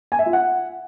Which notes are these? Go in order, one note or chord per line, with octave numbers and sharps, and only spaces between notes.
G#5
E5
F4
F#5